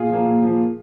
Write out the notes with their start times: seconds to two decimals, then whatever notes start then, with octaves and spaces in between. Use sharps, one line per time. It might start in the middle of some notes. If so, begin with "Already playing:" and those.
Already playing: A#2 F4 G#4
0.10 F3 A#3
0.26 A#2
0.42 F3 A#3